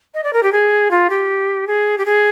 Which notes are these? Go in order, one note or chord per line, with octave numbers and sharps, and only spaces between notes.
D#5
D5
A#4
G4
G#4
F4
G4
G#4
G4
G#4